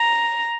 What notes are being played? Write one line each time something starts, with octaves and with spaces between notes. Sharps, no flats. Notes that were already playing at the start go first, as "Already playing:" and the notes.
Already playing: A#5